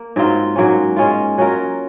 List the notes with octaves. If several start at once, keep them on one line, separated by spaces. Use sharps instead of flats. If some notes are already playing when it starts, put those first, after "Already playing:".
Already playing: A#3
G#2 F#3 C4 F4
G#2 F#3 A#3 C#4
G#3 C#4 F4
F#3 C#4 F4 A#4